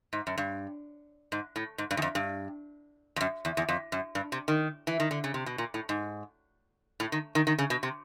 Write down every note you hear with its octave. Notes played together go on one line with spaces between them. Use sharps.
G#2
F#2
G2
G#2
A2
G#2
G2
E2
F2
G2
F2
F#2
E2
E2
F2
F#2
G2
C3
D#3
E3
D#3
D3
C#3
C3
B2
A#2
A2
G#2
A2
D#3
D#3
D#3
C#3
B2
C3